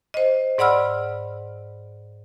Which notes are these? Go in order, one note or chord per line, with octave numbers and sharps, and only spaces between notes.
C5 D#5
G#2 D5 F#5 B5 E6 F6